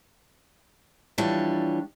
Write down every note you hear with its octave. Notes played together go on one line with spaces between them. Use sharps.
E3 F3 G3 D4 C#5